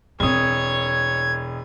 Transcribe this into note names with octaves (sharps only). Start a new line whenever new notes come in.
E1 C4 D4 C#5 D#6 G#6